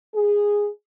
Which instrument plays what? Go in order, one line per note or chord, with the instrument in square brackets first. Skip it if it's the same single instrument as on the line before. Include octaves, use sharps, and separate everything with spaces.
[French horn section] G#4